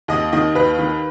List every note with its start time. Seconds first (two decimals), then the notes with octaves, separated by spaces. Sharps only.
0.08 D#2 D#5
0.32 D#3 D#5
0.55 D#2 B4
0.79 D#3